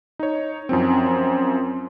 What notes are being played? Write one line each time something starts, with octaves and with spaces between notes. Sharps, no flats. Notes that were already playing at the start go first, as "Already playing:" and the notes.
D#4 C#5
F#2 F3 C4